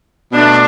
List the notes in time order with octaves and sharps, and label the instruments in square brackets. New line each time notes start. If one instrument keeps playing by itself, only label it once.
[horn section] B2 A3 D4